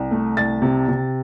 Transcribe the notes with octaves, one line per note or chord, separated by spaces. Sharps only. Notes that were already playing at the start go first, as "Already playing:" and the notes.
Already playing: C2
A3
C2 A6
C3
C3